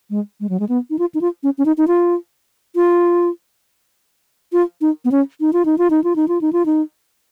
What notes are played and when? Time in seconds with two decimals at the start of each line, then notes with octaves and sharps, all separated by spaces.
0.10 G#3
0.40 G#3
0.49 F#3
0.60 G#3
0.69 B3
0.90 D#4
0.99 F4
1.14 D#4
1.21 F4
1.43 C#4
1.58 C#4
1.66 D#4
1.78 D#4
1.88 F4
2.76 F4
4.53 F4
4.81 D#4
5.05 B3
5.12 C#4
5.40 D#4
5.53 F4
5.65 D#4
5.78 F4
5.90 D#4
6.04 F4
6.16 D#4
6.28 F4
6.41 D#4
6.53 F4
6.66 D#4